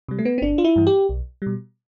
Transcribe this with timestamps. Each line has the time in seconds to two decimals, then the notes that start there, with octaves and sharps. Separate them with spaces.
0.08 C3 G3
0.19 A3
0.25 B3
0.38 C4
0.42 G1 D4
0.58 F4
0.64 E4
0.76 G2 E3
0.87 G4
1.09 B1
1.42 B2 G3